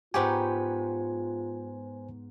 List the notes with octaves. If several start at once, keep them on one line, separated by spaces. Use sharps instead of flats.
G#2 B3 F4 G4 C5 C#5 G#5